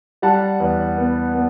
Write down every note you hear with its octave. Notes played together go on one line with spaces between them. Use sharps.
G3 F#5 A5
E2
B3
B3